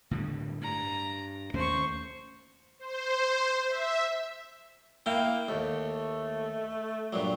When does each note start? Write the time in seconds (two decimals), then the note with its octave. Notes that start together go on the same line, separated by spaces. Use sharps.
0.11 A2 D3 G3
0.61 G2 A#5
1.54 D#2 A3 C#4 C5 C#6
2.79 C5
3.68 E5
5.06 A#3 E4 G5
5.49 D#2 A3
7.13 G2 A#2 F#3